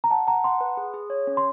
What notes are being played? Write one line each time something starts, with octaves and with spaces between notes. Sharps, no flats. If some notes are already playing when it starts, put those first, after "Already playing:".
A#5
F#5 A5
F#5 A#5
F#5 C6
B4
G#4
G#4
C#5
C#4
C6